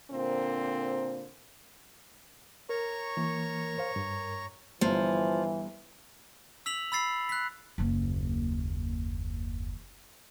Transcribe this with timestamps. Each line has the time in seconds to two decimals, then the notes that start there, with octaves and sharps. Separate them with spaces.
0.11 A#2 D3 C4 A#4 C5
2.69 A#4 C#5 A#5 C#6
3.17 E3 A#3
3.78 C5 F5
3.96 G2
4.81 G1 E3 F3
6.66 E6 B6 F7 F#7
6.92 B5 E6 A6 C7
7.29 F#6 B6
7.78 F#1 D#2